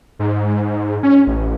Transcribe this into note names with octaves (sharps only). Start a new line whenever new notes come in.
G#2
C#4
A1